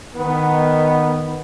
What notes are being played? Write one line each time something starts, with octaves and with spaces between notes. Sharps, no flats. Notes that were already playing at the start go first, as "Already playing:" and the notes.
D#3 B3